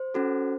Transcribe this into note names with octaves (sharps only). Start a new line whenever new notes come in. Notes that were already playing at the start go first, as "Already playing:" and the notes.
Already playing: C5
C#4 F#4 A4